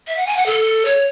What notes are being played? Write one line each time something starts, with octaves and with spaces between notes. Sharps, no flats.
E5
F#5
G#5
F#5
A4
C#5